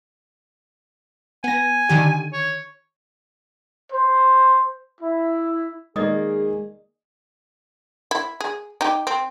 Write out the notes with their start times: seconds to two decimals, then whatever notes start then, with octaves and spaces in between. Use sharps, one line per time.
1.44 B3 G#5 A#6
1.89 D3 D#3 G4
2.33 C#5
3.91 C5
5.01 E4
5.96 D#3 G#3 A#3 G#4 D5 D#5 D#6
8.11 E4
8.41 G#4
8.81 D#4 G4
9.07 C4